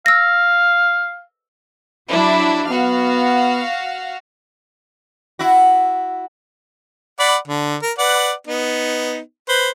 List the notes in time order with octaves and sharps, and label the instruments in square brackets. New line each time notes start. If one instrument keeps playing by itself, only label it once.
[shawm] F5 [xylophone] E6 A#6
[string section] F#3 D4 E4
[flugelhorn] B3 [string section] F#4 F5
[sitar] E4 F#4
[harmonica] D5 F#5 B5
D3
A#4
B4 D5 F#5
B3 D#4
B4 C5